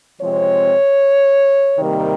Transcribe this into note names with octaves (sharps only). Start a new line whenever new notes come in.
C3 F3 G#3 C4 C#5
C3 D#3 G3 A#3